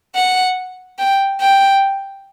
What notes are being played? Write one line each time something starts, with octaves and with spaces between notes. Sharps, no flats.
F#5
G5
G5